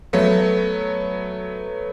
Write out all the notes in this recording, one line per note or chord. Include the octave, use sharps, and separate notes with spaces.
F#3 A3 B3